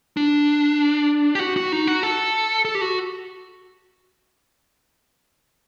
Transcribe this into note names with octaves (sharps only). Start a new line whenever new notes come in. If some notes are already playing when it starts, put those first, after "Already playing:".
D4
G4
F#4
F#4
D#4
F#4
A4
A4
G4
F#4